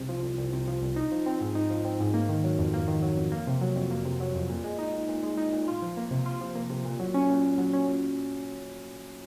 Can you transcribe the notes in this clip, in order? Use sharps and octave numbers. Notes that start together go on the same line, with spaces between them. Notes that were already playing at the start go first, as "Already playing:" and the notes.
Already playing: C2 C3
F3
C2
C2
C3
F3
C2
D#4
F3
C4
G#2
D#4
F3
C4
G#2
A#3
D#3
F#3
F2
A#3
D#3
F#3
F2
A#3
C3
F#3
F2
A#3
C3
F#3
F2
A#2
G#3
D#4
A#2
A#2
G#3
D#4
A#2
F4
F3
A#3
C3
F4
F3
A#3
C3
A#2
F#3
C#4
A#2
A#2
F#3
C#4
A#2